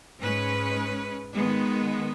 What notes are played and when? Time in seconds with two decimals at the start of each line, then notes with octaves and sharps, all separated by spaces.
0.21 G#2 G#3 C#4 B4
1.36 D#3 G#3 B3